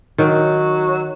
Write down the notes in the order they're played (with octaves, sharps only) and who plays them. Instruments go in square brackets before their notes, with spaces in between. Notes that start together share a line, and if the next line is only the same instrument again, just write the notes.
[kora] D#3 [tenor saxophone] F#3